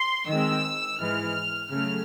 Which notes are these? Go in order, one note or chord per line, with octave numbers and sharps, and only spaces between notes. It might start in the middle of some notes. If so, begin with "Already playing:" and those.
Already playing: C6
D#3 G#3 C4 E6
G#2 E3 G#3 F6
C#3 F#3 A3 F6